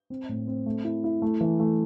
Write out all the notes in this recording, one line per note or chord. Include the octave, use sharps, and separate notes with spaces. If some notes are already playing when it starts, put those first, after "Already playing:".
C4
A2
C4
A3
E4
E4
A3
E3
A3